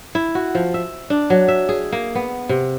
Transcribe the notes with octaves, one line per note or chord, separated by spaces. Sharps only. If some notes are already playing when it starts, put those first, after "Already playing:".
E4
F#4
F3
E5
D4
F#3
E5
G#4
A#3
B3
C3